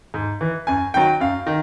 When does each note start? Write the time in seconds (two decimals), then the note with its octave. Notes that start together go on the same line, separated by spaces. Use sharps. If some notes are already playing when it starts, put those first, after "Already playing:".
0.14 G#2
0.41 E3
0.67 F#2 G#5
0.94 D#3 F#3 G5
1.20 F#2 F5
1.47 D#3